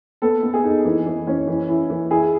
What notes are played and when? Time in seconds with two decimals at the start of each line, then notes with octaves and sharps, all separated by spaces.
0.22 B3 A4
0.43 B3
0.54 G#4
0.64 D#4
0.85 E3
1.06 E3
1.27 C#4
1.47 E3
1.69 E4
1.90 E3
2.10 E4 G#4